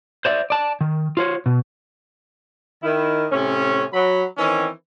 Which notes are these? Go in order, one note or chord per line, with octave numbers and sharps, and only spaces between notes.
C5 D5 E5
D5 A5
D#3
F4 C5 C#5
B2
D#3 E4
A2 C3 C#4
F#3 B5
D#3 E3 C4 C#4